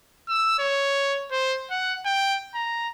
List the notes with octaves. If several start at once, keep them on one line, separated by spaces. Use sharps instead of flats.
E6
C#5
C5
F#5
G5
A#5